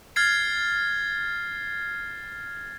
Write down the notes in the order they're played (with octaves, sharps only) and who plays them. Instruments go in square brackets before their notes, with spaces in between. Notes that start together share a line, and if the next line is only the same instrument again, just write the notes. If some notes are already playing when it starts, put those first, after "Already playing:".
[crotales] F6 G#6 A6 C7